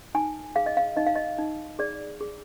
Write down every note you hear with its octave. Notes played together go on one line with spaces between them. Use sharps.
D#4 G#5
G#4 F5
D#5
F5
D#4 D#5
F5
D#5
D#4
G#4 D5
G#4